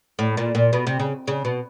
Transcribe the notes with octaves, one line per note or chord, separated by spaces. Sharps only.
A2
A#2
A#2
B2
C3
C#3
C#3
B2